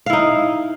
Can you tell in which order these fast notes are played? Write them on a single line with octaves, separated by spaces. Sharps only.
F5 E4 D#4